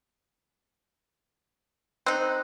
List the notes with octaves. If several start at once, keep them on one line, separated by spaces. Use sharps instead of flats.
C4 D#4 F#6